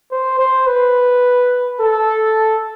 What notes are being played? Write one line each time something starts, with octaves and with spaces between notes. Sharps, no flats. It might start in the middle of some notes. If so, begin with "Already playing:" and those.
C5
C5
B4
A4